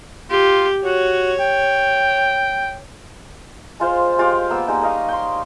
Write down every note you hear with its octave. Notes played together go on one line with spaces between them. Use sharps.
F4 G4
F#4 C#5
G5
G#3 F4 C5 F5
G#3 F4 G4 G5
A#3 B3 E6
G3 G#3 A#3 D#4
A#4 D#5 F5 C#6
G5 C6